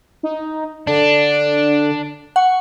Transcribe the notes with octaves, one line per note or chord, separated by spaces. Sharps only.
D#4
D3 D4
F#5 C#6